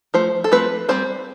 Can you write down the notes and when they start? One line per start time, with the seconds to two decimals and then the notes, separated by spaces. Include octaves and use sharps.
0.14 F3 A3 C5
0.44 A4
0.52 F3 A3 C4 B4
0.89 G3 C4 C5